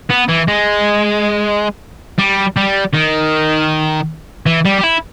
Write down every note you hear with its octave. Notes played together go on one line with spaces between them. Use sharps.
B3
E3
G#3
G3
G3
D#3
E3
G3
G4
E4